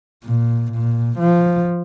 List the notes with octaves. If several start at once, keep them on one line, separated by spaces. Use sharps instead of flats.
A#2
A#2
F3